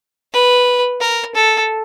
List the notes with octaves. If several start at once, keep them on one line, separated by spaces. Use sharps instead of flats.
B4
A#4
A4